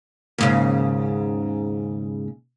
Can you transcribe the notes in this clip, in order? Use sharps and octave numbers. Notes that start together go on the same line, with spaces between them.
D#2 G#2 C#3